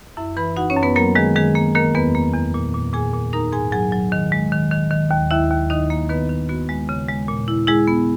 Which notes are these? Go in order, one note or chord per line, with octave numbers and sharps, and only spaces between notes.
F#2 E4 E5
E3 B4 B5
D#4 F#4 F#5
C#4 C#5
F#2
B3 B4
F#3 A#3 A#4
D#3 G#3 G#4
D#3 G#3 G#4
A#3
D#3 A#3 A#4
E2 B3 B4
A#3
E2
A#2
A#2
A#2 G#4 G#5
A#2
D#4 A#4 A#5
G#2 G#4 G#5
F#3 G#4 G#5
F#3
D#3
G#3
D#3
D#3
D#3
D#2
D#2 E4 E5
D#2
D#3 D#4 D#5
A#3
D#3 B3 B4
D#3
B3 F#4
G#3
C#3
G#3
A#2
E4
G#3 E4 G#4
B3